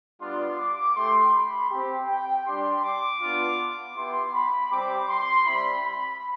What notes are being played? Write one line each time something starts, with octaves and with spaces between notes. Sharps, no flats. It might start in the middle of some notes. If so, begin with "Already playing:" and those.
G3 B3 D4 F4 C6
D6
A3 E4 G4 C6
B5
C4 G4
G5
G3 D4 G4 C6
D6
B3 D4 F4
B3 E4 G4 C6
B5
G3 C4 G4 D6
C6
G3 C4 E4 B5
B5